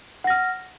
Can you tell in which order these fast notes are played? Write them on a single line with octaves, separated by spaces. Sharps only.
F#5 A#6 F6